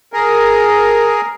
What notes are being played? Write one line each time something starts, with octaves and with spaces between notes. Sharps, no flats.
G#4 A#4